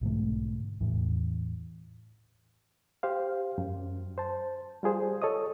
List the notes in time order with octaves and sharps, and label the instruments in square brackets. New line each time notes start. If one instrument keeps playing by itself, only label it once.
[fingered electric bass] B1 G#2 D3 A3
E2 A2 E3
[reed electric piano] G4 C5 F5
F#2
C5 A5
G3 F4 G#4 C5
A4 C#5 D#5 D#6